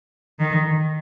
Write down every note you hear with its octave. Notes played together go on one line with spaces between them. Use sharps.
D#3